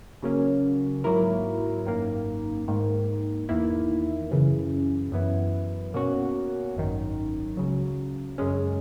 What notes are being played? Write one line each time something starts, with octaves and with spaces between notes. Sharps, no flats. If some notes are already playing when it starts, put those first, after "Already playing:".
C#3 F#3 A#3 C#4
G#2 F#3 A#3 E4 A#4
G#1 F#2 D#3 A#3
G#2 D#3 A#3
E2 D#3 A#3 E4
F#2 C#3 E3
F#2 E3 B3 E4
B2 A#3 C#4 F#4
G#1 F#2 D#3
C#2 C#3 F#3
F#2 C#3 G#3 C#4